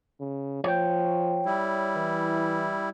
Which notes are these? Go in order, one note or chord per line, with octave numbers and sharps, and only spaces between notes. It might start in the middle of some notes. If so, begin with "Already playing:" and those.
C#3
F3 C#5 G5
G3 E4
E3